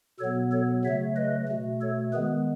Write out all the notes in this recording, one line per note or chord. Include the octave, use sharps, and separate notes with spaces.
B2 F#3 B3 A4 C#5
A4 C#5
C#3 F#3 A3 C#5 E5
B4 D#5
B2 A3
A4 C#5
D#3 G#3 B3 G#4 B4